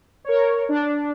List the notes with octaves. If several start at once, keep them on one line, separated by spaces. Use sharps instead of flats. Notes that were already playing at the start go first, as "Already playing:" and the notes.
A#4 C#5
D4